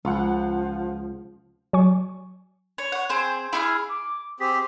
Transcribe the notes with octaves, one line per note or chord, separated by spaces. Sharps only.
C#2 F3 F4 F#5
F#3 G#5 C#6
C#5
C#5 F#5
C4 G#4 C5
E4 G#4 C6 F6
D6
C4 G4 G#4 B6